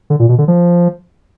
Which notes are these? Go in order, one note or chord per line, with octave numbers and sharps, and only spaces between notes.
D3
A#2
B2
D3
F3